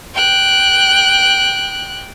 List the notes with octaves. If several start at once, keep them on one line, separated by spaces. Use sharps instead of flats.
G5 F#6